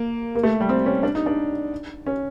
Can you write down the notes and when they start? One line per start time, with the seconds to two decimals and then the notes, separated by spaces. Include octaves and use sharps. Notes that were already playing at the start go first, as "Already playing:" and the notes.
Already playing: A#3
0.35 A#3
0.43 A3
0.60 G3
0.69 C4
0.86 C#4
1.03 D4
1.15 D#4
1.26 D4
2.06 C#4